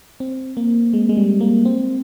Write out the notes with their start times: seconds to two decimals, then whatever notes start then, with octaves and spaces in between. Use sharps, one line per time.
0.20 C4
0.57 A#3
0.93 G#3
1.09 G#3
1.17 G3
1.41 A#3
1.65 C4